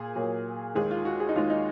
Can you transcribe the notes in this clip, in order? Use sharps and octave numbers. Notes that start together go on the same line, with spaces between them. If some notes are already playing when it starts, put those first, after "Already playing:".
Already playing: A#2 A#3 G#4
A#2 F#3 A#3
D#2 D#3 G#3 G#4
F4
F#4
G#4
D#4
D#2 D#3 G#3 F4
D#4